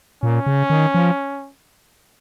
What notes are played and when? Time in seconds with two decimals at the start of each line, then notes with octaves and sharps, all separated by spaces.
0.23 A#2 C#4
0.46 C#3
0.70 D#3
0.95 F3